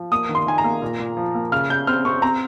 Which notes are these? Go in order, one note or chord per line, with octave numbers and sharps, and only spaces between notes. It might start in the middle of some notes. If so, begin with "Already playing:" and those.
Already playing: F3
A#3 D#6
D#3
C6
D#3 G#5
A#5
A#3
A#2
A#2
F3
A#3
C#3 F6
C#3 G6
C4 F6
C4 C#6
C4 A#5